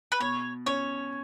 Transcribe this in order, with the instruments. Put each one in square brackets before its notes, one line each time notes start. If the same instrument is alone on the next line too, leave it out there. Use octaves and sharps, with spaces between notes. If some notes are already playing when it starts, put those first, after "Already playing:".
[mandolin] B4
[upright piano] B2 [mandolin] C#5
[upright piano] C#4 [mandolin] C#5